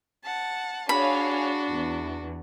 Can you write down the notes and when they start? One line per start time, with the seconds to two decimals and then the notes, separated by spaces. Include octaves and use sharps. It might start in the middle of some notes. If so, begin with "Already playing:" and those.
0.24 F#5 A5
0.89 D4 F#4 G#4 C#5 F5 B5
1.70 E2